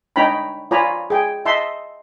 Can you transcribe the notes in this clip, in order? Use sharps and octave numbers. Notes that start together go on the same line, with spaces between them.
D4 D#4 C#5 G5 A#5 B5
F4 C#5 D5 G#5 A#5 B5
G#4 G5
D#5 E5 A5 C6